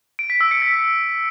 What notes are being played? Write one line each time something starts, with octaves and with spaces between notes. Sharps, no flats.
D7
B6
E6
C#7
B6